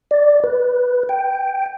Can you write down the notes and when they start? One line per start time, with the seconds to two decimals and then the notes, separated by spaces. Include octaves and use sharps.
0.11 D5
0.44 B4
1.09 G5